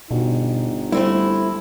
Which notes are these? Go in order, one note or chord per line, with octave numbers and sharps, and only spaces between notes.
G1 B2 D#4
G3 A3 C4 E4